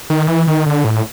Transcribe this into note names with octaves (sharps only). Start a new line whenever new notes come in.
D#3
E3
D#3
D3
A2